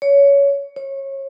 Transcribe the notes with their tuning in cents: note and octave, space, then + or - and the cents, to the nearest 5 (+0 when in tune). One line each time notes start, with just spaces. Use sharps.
C#5 +20
C#5 -25